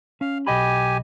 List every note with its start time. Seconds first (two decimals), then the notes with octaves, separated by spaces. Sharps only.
0.21 C#4 F5
0.47 B1 G4 D#5 G#5 B5